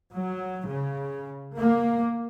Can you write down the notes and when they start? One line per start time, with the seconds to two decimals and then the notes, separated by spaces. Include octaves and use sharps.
0.13 F#3
0.68 C#3
1.58 A#3